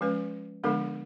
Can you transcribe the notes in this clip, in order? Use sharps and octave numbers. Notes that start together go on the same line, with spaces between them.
F3 G#3 C#4 B4
D3 F3 G#3 B3 D4 A4